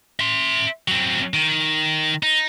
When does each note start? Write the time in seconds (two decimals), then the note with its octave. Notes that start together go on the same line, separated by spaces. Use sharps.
0.20 E5 C6
0.88 F#3 C4
1.34 D#3
2.23 D#4